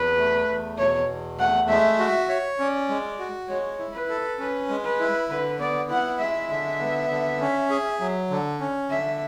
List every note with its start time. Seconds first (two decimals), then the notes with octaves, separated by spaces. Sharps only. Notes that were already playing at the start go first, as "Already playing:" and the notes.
Already playing: E2 B4
0.18 A3
0.48 E2
0.78 B2 C#5
1.09 E2
1.39 A3 F#5
1.69 G#3 E5
1.99 F#4
2.29 C#5
2.59 C#4 D5
2.89 G#3
3.19 F#4
3.49 G#3 C#5
3.79 E4
3.94 B4
4.09 A4
4.39 C#4 B4
4.69 G#3
4.84 B4
5.00 E4
5.30 D3 B4
5.59 B3 D5
5.89 E4 F#5
6.19 G#3 E5
6.50 D3
6.79 B3
7.10 D3
7.40 C#4
7.70 G#4
8.00 F#3
8.30 D3
8.60 C#4
8.90 D3 E5